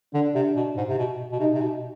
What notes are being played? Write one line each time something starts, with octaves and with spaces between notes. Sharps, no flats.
D3 D4
C3
B2
G#2
C3
B2
B2
C3 D#4
C3
B2